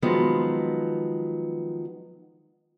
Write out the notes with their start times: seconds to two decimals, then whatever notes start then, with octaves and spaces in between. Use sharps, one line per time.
0.02 D#3 F3 F#3 G#3 B3